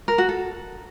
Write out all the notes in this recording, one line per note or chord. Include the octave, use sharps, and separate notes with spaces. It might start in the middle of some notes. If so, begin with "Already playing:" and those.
A#4
F#4
A4